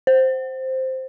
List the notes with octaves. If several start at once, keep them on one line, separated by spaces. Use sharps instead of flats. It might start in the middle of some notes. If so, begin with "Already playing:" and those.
C5